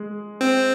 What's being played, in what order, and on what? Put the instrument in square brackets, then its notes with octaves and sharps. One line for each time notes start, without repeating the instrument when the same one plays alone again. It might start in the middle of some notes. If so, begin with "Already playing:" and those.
Already playing: [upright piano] G#3
[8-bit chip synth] C4